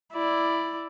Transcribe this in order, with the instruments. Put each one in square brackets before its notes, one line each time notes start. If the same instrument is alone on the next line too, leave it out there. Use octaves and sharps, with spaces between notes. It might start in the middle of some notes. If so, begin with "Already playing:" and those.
[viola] E4 D5